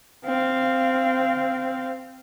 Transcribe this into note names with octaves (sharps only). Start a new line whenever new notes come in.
C4 F5